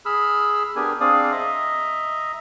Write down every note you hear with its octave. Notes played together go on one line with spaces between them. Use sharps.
G#4 B5 E6 F6
B3 D4 G4 G#4 A#4 G#5
C4 D4 G#4 D5 F5 D#6
D#5 E5 A#5